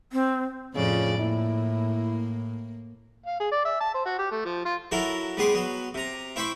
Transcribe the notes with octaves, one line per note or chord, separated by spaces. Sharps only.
C4
F2 A2 C#3 F3 D5
A#3 E4
F5
G#4
D5
E5
A5
C5
F#4
G4
A3
F3
F4
F#3 E4 A4 A#4
G3 B3 G#4 C6 D6
F#3 B3
C3 A#5
E4 C5 G5 B5 C#6